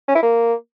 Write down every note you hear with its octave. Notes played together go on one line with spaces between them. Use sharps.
C#4
E4
A#3